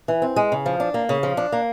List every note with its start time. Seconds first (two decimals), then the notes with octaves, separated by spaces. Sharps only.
0.08 E3
0.22 C4
0.36 G#3
0.52 C#3
0.66 F3
0.80 D4
0.94 A#3
1.09 C#3
1.23 F3
1.37 D4
1.52 A#3